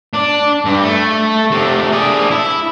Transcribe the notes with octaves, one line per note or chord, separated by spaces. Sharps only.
D4
G2
A3
C3 A3
D4 G#4
E4